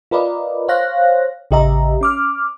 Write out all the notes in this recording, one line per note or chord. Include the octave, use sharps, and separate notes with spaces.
F4 A#4 B4 D5 D#5
C5 C#5 F5 F#6 A#6
A1 C#3 G4 D#5 E5 A#5
C#4 D6 F6